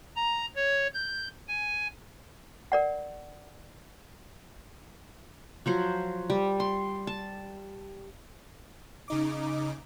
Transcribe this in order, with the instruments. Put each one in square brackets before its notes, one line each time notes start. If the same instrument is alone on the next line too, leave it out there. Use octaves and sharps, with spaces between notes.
[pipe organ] A#5
C#5
G6
G#5
[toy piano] A#4 D5 F#5
[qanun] F3 F#3 C5
G3
C6
A5
[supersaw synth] C#3 D#4 D6